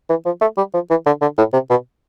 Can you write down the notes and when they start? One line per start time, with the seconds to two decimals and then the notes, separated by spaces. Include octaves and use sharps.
0.09 E3
0.26 F3
0.41 A3
0.57 G3
0.74 F3
0.90 E3
1.06 D3
1.21 D3
1.38 A2
1.53 C3
1.70 B2